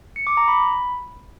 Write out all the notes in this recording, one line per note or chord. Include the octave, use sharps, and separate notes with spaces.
C#7
D6
A#5
B5